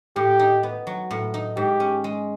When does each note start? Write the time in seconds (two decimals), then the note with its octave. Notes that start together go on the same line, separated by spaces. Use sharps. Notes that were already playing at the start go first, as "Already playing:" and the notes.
0.16 A2 G4
0.39 D#4
0.63 B3
0.87 F#3
1.11 A2
1.34 D#4
1.56 G#2 G4
1.80 C#4
2.04 G#3